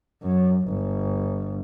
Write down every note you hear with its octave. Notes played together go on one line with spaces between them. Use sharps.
F#2
G1